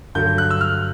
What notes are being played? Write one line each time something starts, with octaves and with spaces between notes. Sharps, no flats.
G2 D3 F#3 G6
F#6
E6
F6